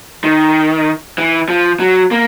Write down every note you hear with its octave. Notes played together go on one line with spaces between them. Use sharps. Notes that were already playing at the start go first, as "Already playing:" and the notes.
D#3
E3
F3
F#3
A#3